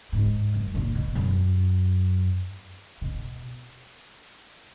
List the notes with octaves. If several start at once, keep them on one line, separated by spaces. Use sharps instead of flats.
G#2
F#2
A#2
B2
F#2
B2